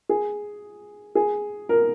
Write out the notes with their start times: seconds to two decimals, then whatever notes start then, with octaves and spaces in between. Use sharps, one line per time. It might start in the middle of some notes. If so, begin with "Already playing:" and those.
0.09 G#4
1.15 G#4
1.69 A#4